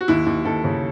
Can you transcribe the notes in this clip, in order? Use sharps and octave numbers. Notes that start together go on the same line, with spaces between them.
F#4
D#2 E4
D#2
D#2 A4
C#3